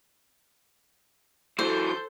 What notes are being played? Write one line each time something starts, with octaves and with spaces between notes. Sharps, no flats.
E3 F#3 A4 C5 G6